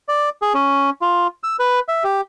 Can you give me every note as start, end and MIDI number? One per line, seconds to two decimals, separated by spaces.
0.09 0.29 74
0.42 0.53 68
0.54 0.90 61
1.02 1.27 65
1.43 1.56 88
1.59 1.79 71
1.89 2.03 76
2.04 2.21 67